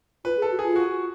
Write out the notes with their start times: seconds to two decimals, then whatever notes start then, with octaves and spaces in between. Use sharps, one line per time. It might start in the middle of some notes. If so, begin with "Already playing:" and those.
0.25 F4 B4
0.37 G#4
0.42 A4
0.51 F#4
0.59 F4 G#4
0.76 F#4